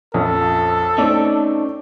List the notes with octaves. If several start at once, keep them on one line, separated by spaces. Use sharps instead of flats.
A#1 F2 C#4 A4
A3 C4 C#4 D#4 D5